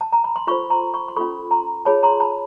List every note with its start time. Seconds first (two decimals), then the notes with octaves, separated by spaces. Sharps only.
0.01 A5
0.12 A#5
0.24 B5
0.36 C6
0.47 F4 A4 C5 B5 C#6
0.70 A#5 C6
0.94 B5 C#6
1.08 C6
1.16 C#4 F4 A4 B5 C#6
1.51 A#5 C6
1.85 F4 G#4 C#5 A5 B5
2.03 A#5 C6
2.20 A5 B5